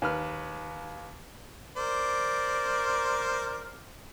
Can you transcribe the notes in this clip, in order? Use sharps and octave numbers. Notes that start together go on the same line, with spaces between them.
D#2 B4 F6
A#4 C5 D5